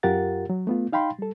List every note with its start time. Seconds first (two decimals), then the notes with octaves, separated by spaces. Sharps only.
0.03 F#2 F4 G4 A#4 F#5 A6
0.50 F#3
0.67 A3 B3 F4
0.93 D#4 F5 G5 B5 C6
1.19 G3 A4